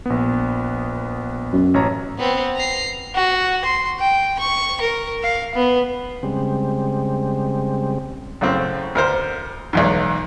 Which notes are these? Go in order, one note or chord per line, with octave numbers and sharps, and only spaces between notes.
A#1 B3
F#2
A1 C#5 A#5
B3 C4
A#5 C7
F#4
C6
G5
C#6
A#4
F5
B3
C#3 G3 G#3 C4
F#2 A2 C#3 C4
D2 A#4 C5
B1 E2 G#2